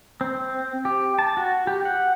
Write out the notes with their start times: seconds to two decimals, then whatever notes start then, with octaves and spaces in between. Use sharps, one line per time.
0.21 C4
0.85 G4
1.19 A5
1.37 F#4
1.67 G4
1.85 F#5